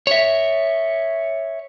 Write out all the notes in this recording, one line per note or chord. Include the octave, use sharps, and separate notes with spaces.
C#5 E5